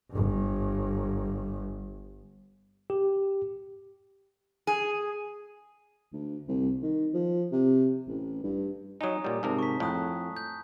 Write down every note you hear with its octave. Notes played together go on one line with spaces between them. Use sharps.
G1 G2
G4
G#4
D2
C2
D#3
F3
C3
A1
G2
F#3 D#4 G#5 A#5 D#6
A#2 G3
G#2 C3 A#4 A5
C#6 B6
F2 A2 A#5 D#6 F#6
G6